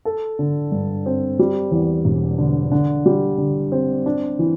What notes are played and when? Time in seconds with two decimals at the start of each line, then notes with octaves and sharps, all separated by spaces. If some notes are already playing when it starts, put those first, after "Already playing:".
0.05 A4
0.39 D3
0.72 G2
1.06 C4
1.39 G3
1.71 E2
2.05 E1
2.38 D3
2.71 D3
3.06 G3
3.38 D3
3.72 C4
4.06 D4
4.39 E3